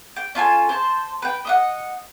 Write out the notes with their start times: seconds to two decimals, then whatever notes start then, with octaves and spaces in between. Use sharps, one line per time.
0.16 G5
0.35 C#4 F4 A4 G#5
0.69 C5 A5
1.22 B4 G5
1.45 D#5 E5 F#5